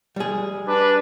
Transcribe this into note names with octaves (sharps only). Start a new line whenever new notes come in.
G3 G#4
D4 B4